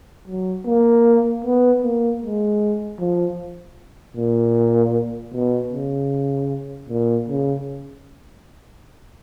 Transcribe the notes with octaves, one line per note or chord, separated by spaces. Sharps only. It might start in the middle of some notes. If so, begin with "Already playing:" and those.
F#3
A#3
B3
A#3
G#3
F3
A#2
B2
C#3
A#2
C#3